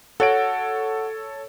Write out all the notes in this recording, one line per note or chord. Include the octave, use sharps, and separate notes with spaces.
F#4 A4 C#5 D7